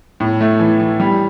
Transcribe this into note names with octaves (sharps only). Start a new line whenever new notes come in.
A2
A3
E3
E3
G3